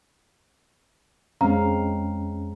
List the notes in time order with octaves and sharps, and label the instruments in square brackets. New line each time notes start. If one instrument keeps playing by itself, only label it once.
[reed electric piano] F2 C#4 [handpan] G#3 C4 F5 [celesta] A#5